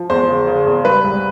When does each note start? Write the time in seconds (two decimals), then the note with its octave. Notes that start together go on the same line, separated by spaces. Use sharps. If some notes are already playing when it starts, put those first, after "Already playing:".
Already playing: F3
0.10 E2 C5
0.28 C#3
0.47 C#3
0.66 E2
0.84 G3 B4
1.04 C2